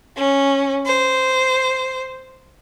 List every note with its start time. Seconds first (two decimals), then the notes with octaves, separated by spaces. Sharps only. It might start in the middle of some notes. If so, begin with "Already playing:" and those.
0.16 C#4
0.86 C5